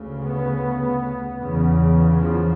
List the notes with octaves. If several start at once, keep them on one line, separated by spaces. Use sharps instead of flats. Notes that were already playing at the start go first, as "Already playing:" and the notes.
Already playing: D2 C#3
B3
E2 C#3
F3